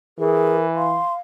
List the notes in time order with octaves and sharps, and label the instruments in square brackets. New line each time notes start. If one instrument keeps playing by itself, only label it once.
[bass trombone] E3 [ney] G#4 [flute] A#4
[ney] F5 [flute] C6